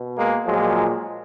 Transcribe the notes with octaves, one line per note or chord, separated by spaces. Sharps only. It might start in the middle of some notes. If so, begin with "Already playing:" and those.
Already playing: B2
G#3 A#3
A#2 F3 F#3 G#3